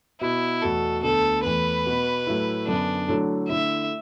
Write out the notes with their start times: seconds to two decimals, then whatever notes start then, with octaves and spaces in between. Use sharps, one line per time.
0.21 B2 B3 E4 F#4
0.62 E2 B2 A3 F#4 A4
1.03 D2 D3 B3 A4
1.44 E2 E3 A3 B4
1.86 B2 B3 F#4
2.27 A2 F#3 A3 E4
2.67 F#2 D3 B3 D4
3.08 D3 F#3 A3 E4
3.49 D3 A3 E4 E5